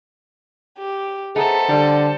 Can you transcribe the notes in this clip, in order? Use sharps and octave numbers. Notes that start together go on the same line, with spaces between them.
G4
A3 B3 D#4 G#4 A4 C5
D3 G3